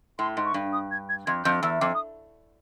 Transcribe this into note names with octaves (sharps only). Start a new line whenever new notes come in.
A2 C6
G#2
C#6
G2
D#6
G#6
G#6
F2 G#6
F2 G6
E2 E6
F2 D6
D#6